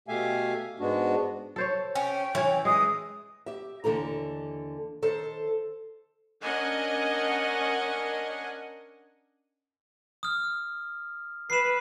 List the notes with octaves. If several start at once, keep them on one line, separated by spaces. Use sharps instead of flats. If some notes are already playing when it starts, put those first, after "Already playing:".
B2 A3 G4 E5 F5 G#5
G#2 G#3 B3 D4 F#4
A4 C5 C#5
C#4 G5
E3 C#4 C#5
G#3 D#5 D#6
G4 E5
D#2 D3 E3 A4 A#5
D#3 A4 C5
C#4 D4 A#4 D#5 F#5 G#5
D#6 F6
B4 C7 E7